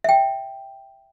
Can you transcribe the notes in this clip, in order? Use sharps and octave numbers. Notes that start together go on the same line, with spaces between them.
E5 G5